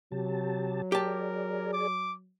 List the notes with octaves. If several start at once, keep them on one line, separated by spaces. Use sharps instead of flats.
C3 F#3 G4 A5
G4 G#4 A#4 D5 A5
D6